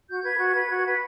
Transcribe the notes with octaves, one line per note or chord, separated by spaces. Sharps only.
F#4 G6
B4 G#6
F#4
B4
F#4
B4